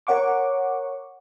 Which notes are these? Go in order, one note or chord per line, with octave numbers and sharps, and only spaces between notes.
A#4 C#5 F#5 C#6 D6